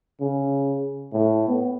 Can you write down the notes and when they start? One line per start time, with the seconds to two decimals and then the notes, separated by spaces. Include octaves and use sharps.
0.21 C#3
1.13 A2
1.48 B3